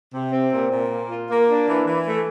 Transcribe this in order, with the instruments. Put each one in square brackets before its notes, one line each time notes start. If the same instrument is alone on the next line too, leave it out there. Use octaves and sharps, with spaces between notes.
[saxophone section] C3
C4
A#2
A#2
A#3
F4
A#3
D4
E3
E3
A3